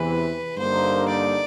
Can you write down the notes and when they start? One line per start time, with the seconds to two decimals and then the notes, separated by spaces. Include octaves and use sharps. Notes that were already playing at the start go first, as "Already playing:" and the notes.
Already playing: E2 C3 E3 B4
0.57 G2 D3 G3 A#3 D#4 C5
1.09 D5